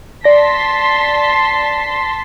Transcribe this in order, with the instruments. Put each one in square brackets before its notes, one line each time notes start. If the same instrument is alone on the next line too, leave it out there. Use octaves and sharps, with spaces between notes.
[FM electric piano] D5 A#6 [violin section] A5 C6 B6